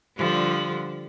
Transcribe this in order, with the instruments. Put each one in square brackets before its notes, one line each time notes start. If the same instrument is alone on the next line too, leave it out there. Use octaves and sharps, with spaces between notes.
[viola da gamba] D3 F3 G3